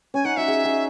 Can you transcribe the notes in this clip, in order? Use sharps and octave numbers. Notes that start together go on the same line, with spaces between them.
C#4 G#5
D#4 F#5
F#4 E5
G#4
G#4